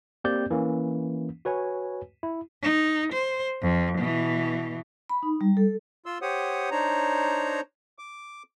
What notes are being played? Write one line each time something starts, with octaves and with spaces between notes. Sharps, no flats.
A#3 C4 G4 D5 G6
E3 A#3 C#4
F#4 B4 C#5 G#5
E4
D#4
C5
F2
B2 E3
B5
D#4
G3
A4
F4 C6 E6
G4 C5 C#5 F#5 D#6
D4 D#4 C5 C#5 A#5
D6